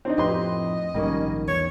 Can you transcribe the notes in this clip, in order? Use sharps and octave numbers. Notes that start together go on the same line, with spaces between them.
C4 D4 D#4
F2 A2 G4 B4 D#5 C6
A#1 G#2 D#3 G3 A#3 C#4
E2 C#5